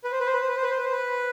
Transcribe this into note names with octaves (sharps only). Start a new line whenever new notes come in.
B4
C5
B4
C5
B4
C5
B4
C5
B4
C5
B4
C5
B4